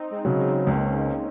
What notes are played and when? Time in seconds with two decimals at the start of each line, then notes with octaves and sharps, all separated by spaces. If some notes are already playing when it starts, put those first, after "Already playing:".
Already playing: C4 D#4
0.11 G#3 C4
0.25 C#3 F#3
0.38 C4 D#4
0.67 C#2 A#3 C#4